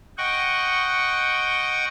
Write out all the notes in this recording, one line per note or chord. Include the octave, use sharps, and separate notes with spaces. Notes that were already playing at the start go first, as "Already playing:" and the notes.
D#5 F#5 G5 C#6